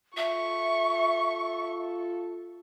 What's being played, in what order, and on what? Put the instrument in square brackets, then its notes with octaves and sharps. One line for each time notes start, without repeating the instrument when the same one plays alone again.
[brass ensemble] F4 A4 [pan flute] E5 [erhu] C#6